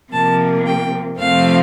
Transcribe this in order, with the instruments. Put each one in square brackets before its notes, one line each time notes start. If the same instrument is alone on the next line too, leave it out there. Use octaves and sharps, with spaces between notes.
[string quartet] C3 F3 A#3 A5
G5
F2 C3 F3 A3 C4 F5